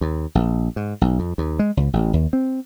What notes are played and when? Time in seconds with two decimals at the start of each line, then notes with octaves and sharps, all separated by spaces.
0.01 D#2
0.35 A#1
0.76 G#2
1.01 B1
1.19 F2
1.38 D#2
1.59 G#3
1.77 C#2
1.93 A1
2.13 D#2
2.33 C4